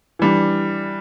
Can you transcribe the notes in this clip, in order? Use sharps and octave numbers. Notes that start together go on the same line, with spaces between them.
E3 G3 D4